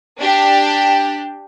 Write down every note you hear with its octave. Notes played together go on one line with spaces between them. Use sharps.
D4 G4